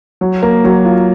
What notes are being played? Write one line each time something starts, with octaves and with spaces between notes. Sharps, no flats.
F#3
A#3
F#3
F4